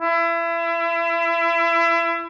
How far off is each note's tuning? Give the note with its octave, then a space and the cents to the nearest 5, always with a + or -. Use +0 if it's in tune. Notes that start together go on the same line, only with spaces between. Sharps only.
E4 +30